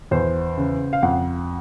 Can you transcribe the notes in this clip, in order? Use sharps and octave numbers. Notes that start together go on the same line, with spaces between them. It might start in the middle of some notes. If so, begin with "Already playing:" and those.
E2 C5
C#3
F5
F2 F#5